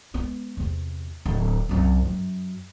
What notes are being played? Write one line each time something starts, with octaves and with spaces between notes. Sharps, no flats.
G#3 B3
E2 C3
D1
C2 F#2
F#2